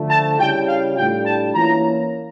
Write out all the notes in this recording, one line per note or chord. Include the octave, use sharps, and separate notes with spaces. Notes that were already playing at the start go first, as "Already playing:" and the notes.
Already playing: D3 F3 A3
A5
C#3 G3 C#4 E4 G5
F5
A2 G3 D4 F4 G5
A5
E3 A#3 C#4 E4 A#5